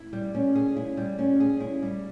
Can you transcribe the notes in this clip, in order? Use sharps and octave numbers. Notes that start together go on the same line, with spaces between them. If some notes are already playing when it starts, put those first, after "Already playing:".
Already playing: E4
G3
C#4
G#4
E4
G3
C#4
G#4
E4
G3